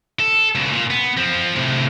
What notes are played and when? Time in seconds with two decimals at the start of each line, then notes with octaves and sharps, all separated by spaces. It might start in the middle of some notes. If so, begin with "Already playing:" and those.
0.20 A4
0.55 C#2 B2
0.72 A#2
0.90 B3
1.17 F3 C4
1.56 A2 C3